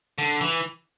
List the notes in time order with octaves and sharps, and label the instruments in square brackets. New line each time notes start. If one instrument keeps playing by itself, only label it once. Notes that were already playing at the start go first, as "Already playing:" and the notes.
[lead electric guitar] D3
E3